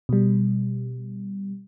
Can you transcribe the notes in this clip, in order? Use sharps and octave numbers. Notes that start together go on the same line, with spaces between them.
B2 G3